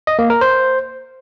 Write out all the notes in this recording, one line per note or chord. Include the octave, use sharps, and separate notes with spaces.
D#5
A#3
A#4
C5